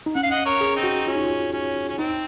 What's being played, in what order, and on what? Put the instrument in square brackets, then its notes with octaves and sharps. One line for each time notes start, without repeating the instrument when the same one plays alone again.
[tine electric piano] D#4
[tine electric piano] C#4 [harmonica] F#5
[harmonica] F5
D#5 F#5
A#4 C#5
[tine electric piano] G#4
[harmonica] C4 D#4
[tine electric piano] F#4
[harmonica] C#4 [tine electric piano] F4
[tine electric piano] D#4
F4
[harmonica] C#4
C#4
[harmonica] C4 [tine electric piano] D#4